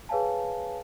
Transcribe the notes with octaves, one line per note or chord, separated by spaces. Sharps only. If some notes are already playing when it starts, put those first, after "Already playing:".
G#4 B4 C#5 F5 G#5 A5